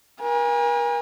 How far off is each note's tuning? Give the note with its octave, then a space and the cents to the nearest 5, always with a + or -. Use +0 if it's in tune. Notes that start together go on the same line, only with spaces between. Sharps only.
A#4 +40 G#5 -30